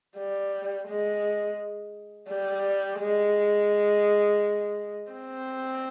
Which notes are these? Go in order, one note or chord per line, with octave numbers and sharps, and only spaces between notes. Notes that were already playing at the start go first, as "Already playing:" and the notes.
G3
G#3
G3
G#3
C4